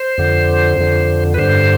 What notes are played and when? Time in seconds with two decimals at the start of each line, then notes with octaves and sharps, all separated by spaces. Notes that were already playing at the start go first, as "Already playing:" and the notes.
Already playing: C5
0.18 F2 D3
0.78 F2 D3
1.34 B4
1.38 G2 D3 C5